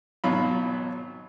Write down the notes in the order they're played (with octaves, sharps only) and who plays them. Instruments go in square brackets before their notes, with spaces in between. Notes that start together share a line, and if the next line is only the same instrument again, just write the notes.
[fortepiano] G#1 B2 F#3 F4 B5